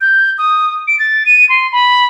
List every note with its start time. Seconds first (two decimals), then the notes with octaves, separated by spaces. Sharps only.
0.01 G6
0.38 D#6
0.88 D7
0.99 A6
1.26 D#7
1.49 C6
1.72 B5